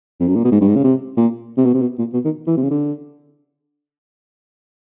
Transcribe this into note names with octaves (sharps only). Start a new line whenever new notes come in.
F2
F#2
A#2
B2
G#2
G2
G#2
C#3
C3
A#2
C3
B2
C3
B2
A#2
B2
D#3
E3
C3
C#3
D3